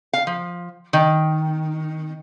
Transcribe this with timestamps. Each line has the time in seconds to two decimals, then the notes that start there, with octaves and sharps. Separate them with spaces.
0.13 F5
0.27 F3
0.93 D#3